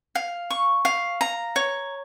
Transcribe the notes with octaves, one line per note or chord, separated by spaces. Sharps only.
F5
C#6
F5
A#5
C#5